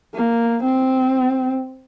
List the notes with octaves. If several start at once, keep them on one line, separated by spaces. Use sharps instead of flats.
A#3
C4